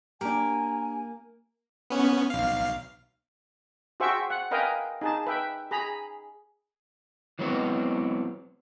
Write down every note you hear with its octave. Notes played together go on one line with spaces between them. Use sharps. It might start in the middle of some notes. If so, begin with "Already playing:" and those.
A#3 D4 G4 A#4 G#5
B3 C#4
B1 F5
F#4 G#4 C5 E5 G5 C#6
F#5
A#4 B4 D#5 F5 G5 G#5
D#4 G#4 A5
B4 E5 G5
G#4 A#5 B5
E3 F#3 G#3 B3 C4